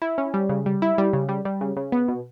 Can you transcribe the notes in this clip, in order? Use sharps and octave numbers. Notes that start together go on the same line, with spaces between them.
E4
C#4
G3
C#3
G3
E4
G3
C#3
G3
G3
C#3
C#3
B3
B2